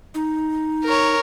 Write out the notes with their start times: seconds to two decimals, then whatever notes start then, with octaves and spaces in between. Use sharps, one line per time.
0.15 D#4
0.84 A#4 C#5